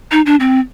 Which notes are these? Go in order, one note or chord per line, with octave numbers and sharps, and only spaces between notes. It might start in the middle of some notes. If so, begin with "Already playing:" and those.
D#4
D4
C4